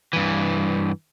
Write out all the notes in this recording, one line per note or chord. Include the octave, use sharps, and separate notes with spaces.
G2 E3